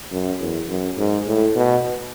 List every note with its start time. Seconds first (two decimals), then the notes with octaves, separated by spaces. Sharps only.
0.12 F#2
0.40 E2
0.69 F#2
0.97 G#2
1.27 A2
1.56 B2